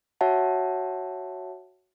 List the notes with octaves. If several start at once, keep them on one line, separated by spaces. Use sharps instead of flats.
F#4 C#5 E5 F#5 A5